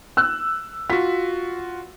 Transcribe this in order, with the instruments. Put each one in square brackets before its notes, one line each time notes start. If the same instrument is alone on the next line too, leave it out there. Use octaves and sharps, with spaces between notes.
[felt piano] E6 F#6
[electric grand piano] F4 F#4 [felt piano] B6